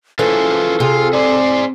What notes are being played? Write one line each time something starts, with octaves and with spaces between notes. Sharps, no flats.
E3 C#4 F4 G#4 A4 C5
C3 F4 G#4
G#4 C5 D5